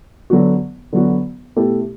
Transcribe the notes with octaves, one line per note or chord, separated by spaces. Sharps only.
D3 F#3 B3 F#4
D3 F#3 B3 F#4
B2 A3 E4 G4